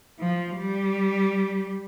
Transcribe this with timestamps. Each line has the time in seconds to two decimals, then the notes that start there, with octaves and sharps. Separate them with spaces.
0.20 F3
0.57 G3